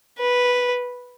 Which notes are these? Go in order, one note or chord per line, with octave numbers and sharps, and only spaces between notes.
B4